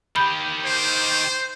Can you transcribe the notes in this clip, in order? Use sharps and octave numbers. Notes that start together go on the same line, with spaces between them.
D#3 G4 B5 G6
C5